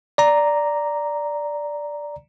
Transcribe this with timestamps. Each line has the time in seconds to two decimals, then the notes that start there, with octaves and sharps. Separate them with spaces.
0.18 D5 A#5